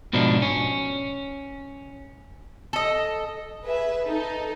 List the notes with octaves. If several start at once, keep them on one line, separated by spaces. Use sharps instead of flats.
G#2 B2 F3 D4 D#4
C#4
A4 D#5
G#4 B4 E5
D#4 A4